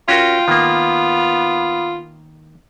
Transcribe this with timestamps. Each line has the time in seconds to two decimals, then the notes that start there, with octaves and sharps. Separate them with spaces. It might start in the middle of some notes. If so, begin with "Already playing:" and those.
0.08 C#4 F4 F#4 A#4 G5
0.48 D#3 A#3 B3